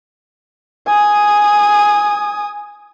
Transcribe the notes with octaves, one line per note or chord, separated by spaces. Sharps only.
G#5 D#6